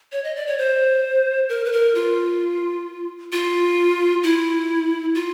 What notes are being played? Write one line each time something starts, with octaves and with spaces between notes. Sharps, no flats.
C#5
D#5
D5
C#5
C5
A#4
B4
A#4
F4
F4
E4
F4